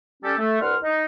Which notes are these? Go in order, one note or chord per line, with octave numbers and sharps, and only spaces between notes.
G3 C#4 G4 A4
A3
C2 D4 B4 F#5 C6 F6
D#4